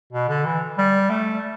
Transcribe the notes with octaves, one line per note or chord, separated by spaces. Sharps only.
B2
D3
E3
G3
A3